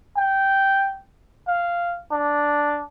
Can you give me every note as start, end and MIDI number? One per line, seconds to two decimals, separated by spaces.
0.17 1.02 79
1.48 1.99 77
2.12 2.81 62